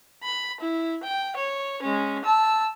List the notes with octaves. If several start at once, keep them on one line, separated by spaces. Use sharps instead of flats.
B5
E4
G5
C#5
G#3 C#4
A5 E6